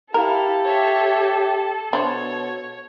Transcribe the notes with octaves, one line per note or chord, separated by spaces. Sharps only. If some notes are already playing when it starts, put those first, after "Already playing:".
E4 G4 A4 A#4 F5
C#5 E5
B2 D4 C5 C#5